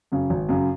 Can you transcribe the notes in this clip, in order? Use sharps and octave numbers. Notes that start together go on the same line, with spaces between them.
F#2 C#3
G#1
F#2 C#3